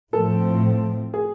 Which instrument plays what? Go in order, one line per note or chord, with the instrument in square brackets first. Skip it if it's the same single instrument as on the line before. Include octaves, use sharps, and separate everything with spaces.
[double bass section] A2 F3 A3 C4 [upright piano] A4
[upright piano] G#4